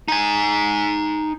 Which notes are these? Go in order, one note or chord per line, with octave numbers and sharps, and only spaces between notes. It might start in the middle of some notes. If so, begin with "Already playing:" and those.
D#4 G#5